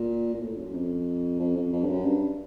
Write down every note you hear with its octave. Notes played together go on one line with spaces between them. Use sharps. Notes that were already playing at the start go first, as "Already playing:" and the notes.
Already playing: A#2
A#2
A2
F#2
F2
F2
F2
F2
G2
F#2
G2